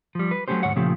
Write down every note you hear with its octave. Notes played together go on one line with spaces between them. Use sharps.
F3 G3
B4
F#3 G#3 A3 C#4 G4 C5
D2 G#2 C#5 F#5
A#2 C#3 F3 A3 G4